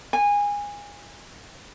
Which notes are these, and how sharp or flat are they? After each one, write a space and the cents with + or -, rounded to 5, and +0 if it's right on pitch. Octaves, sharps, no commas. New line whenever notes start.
G#5 -20